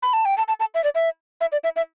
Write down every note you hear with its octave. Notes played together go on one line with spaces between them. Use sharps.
B5
A5
G5
A5
A5
A5
E5
D5
E5
E5
D5
E5
E5